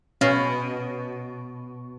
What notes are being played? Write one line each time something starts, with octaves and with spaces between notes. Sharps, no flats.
B2 C#4 F5